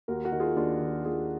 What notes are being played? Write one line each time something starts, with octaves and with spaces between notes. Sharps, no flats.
D#2 F#4 A#4
F#4 A#4
D#3
F4 G#4
D#2 D4 F4
D#3
D#2 F4 G#4